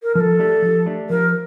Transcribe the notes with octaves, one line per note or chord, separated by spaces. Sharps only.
A#4
F3 A4 A#4
A3 D4 G4
F3
A3 D4 G4
F3 A#4